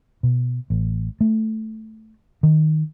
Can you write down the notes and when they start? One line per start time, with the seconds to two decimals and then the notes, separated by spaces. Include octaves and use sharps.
0.23 B2
0.70 A1
1.21 A3
2.43 D#3